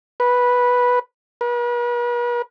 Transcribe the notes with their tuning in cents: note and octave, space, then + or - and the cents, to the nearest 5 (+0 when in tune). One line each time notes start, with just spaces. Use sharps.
B4 -10
B4 -45